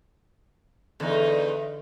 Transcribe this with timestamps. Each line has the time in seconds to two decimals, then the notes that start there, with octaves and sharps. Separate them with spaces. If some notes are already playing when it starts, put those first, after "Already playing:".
1.00 E2 D3 D#4